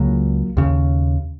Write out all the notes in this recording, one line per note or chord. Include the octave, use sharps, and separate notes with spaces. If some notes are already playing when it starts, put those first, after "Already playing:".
Already playing: C#2 C#3 F#3 A#3
D#2 C#3